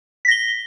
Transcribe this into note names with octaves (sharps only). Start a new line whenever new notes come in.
A#6 B6 G7